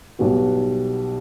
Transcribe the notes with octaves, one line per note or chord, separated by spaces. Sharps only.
B1 B2 G3 B3 F#4